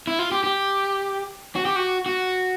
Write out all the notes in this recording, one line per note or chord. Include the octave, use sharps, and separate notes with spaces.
E4
F4
G4
G4
F#4
G4
F#4
F#4